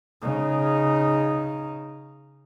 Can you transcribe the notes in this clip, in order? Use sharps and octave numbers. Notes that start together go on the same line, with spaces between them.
C#3 D#4